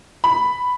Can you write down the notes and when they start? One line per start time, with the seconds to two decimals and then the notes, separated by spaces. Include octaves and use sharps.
0.24 B5